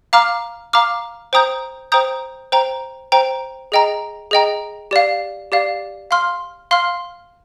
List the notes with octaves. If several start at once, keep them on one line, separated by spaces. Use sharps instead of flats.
F5 A#5 D6 F6
F5 A#5 D6 F6
C5 G5 A#5 D#6 G6
C5 G5 A#5 D#6 G6
C5 G5 A#5
C5 G5 A#5
G#4 D#5 G5 A#5
G#4 D#5 G5 A#5
G4 D5 F5
G4 D5 F5
F5 C6 F6
F5 C6 F6